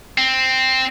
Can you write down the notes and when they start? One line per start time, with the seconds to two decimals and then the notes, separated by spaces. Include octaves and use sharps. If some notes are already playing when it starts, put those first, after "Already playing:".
0.18 C4